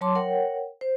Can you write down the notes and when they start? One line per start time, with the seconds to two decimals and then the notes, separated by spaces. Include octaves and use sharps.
0.01 F#3 C#5 A5 C6 D6
0.15 A#4 C#5 F#5 G5
0.81 C5